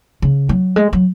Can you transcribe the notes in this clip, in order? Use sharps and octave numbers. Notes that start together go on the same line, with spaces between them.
C#3
F#3
G#3
F#3